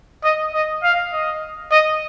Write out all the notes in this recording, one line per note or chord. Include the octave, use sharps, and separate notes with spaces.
D#5
D#5
F5
D#5
D#5